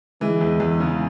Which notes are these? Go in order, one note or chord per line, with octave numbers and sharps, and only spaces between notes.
E3 G#3
E2
E2
C#3